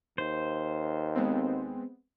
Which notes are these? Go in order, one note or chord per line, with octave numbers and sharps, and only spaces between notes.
D#2 C5
G#3 B3 C4